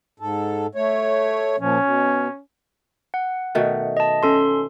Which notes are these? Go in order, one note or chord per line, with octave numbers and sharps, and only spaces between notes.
G#2 A4
A3 C#5
A#2 F3 C#4
B2
F#5
B2 D#3 A3
D#5 A5
C#4 A4 C6